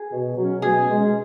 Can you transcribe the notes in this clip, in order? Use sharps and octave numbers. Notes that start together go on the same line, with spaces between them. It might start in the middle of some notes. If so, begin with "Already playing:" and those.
Already playing: G#4
B2
F#3 C#4
B2 G#4
G#3 C#4